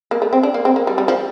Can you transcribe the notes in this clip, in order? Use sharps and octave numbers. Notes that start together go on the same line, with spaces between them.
A#3
A3
C4
D4
A#3
C4
A#3
G3
G3
F3